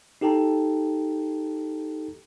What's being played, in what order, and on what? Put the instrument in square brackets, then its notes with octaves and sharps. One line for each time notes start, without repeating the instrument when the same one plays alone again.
[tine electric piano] D#4 G4 A4 G5 A5 A#5